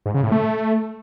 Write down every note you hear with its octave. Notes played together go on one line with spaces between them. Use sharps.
G#2
C#3
A2
A3